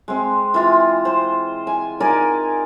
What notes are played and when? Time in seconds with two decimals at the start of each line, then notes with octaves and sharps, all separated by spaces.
0.08 G#3 C4
0.54 E3 F4
1.05 C5
1.67 G#5
2.00 D#4 A#4 D5 G#5